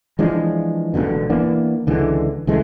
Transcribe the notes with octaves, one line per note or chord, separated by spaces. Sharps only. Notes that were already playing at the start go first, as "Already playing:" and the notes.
E3 F3 G#3 D4
E1 A#1 B2 D3
E3 A#3 B3 D4
C#2 D3 E3 G#3
C#2 E3 G#3 A3